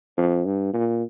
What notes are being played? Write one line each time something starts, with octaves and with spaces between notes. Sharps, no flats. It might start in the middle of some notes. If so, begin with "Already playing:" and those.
F2
G2
A#2